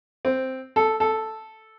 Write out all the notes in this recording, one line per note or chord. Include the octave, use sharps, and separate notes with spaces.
C4
A4
A4